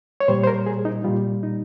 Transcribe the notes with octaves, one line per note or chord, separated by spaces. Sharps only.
C#5
A#2 G3 C5
C5
A#4
G#4
D#4
A#2 G3 F4
D#4